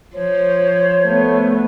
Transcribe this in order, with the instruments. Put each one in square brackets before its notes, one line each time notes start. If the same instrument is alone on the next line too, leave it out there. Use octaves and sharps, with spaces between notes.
[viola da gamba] F3 [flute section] C5 C#5
[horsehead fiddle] A3 B3